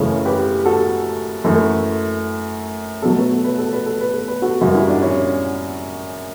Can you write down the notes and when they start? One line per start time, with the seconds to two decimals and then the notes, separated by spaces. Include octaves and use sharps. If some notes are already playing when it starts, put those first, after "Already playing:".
Already playing: F#2 C#3 E3 A3 C#4
0.25 G4 B4
0.66 F#4 A4
1.44 F#2 E3 A3
3.02 B2 F#3 A3 A4
3.17 B4
3.31 A4
3.44 B4
3.58 A4
3.73 B4
3.86 A4
4.01 B4
4.14 A4
4.28 B4
4.42 F#4 A4
4.61 F#2 C#3 G3 F#4
4.75 E4
4.88 D4
5.03 C#4 E4